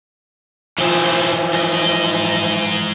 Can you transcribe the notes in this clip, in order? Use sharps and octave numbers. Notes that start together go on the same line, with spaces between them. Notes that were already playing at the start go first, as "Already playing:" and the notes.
B2 E3 F3 C4
G#2 D#5